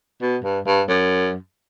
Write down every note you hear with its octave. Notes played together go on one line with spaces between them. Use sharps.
B2
G2
G2
F#2